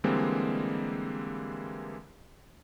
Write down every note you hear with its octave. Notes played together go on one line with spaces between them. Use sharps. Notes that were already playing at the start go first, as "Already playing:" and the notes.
D3 E3 G3 G#3 A#3 C4